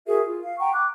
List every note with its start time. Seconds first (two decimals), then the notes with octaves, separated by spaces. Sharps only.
0.06 F#4 G#4 A#4 E5
0.26 F4
0.44 F5
0.59 F#5 G5 A#5 C#6
0.74 D6 F#6